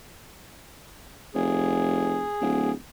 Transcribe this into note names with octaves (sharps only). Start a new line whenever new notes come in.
F1 G#4
D1